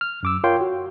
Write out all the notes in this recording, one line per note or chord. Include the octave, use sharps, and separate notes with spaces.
F6
F#2 D6 E6
F4 A#4 C#5 F5 G5 C6
F#4